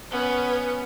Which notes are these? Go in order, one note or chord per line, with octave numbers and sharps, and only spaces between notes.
B3 C#4